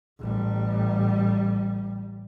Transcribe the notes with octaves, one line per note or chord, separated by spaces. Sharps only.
A1 G3